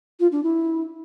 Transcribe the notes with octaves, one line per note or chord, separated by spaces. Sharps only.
F4
D4
E4